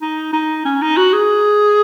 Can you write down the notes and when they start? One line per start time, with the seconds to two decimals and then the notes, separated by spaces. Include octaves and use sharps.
0.02 D#4
0.33 D#4
0.65 C#4
0.82 D#4
0.97 F#4
1.13 G#4